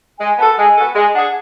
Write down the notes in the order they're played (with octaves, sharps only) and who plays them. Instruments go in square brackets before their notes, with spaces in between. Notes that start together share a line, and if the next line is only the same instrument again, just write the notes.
[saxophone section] G#3 [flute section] G#5
[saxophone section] B3 F#4 A4 [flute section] A5
[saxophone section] G#3 [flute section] G#5
[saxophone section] B3 F#4 A4
[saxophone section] G#3 [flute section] G#5
[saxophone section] D4 G#4 [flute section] F#5